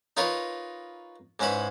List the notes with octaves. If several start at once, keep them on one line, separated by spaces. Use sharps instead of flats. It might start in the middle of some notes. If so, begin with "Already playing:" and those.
D#4 F4 A#4 B4 C#5
G#2 G#3 C#4 E4 B4 B5